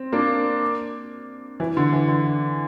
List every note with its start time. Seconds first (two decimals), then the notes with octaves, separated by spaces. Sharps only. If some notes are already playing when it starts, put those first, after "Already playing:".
Already playing: C4
0.12 A#3 D4
1.60 E3
1.77 D3
1.93 E3
2.08 D3